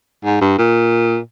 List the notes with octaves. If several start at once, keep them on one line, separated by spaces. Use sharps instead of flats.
G#2
G2
A#2